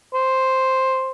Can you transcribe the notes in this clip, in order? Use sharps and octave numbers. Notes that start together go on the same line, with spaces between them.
C5